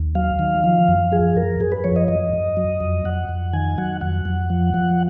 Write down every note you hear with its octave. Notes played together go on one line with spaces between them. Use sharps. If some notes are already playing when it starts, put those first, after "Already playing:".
Already playing: D#2
F#3 F5
D#3
F3
F#2
F3 G#4
F#2 A#4
F#2 G#4
B4
F3 C#5
D#5
F#2 D#5
F#2
F#3
F2
F2 F#5
F2
D#3 G#5
F#3 F#5
F2 F#5
F2
F3
F3